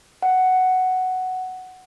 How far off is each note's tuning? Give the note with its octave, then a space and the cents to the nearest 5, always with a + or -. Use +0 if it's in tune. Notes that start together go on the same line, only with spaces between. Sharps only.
F#5 +5